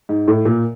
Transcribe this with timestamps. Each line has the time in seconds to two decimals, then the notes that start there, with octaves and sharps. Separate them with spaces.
0.09 G#2
0.28 A2
0.45 A#2